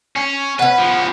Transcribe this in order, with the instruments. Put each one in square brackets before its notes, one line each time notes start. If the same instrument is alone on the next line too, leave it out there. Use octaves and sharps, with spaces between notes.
[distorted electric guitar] C#4
[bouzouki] C#4 F#5 [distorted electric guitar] B4
[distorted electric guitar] F3 B3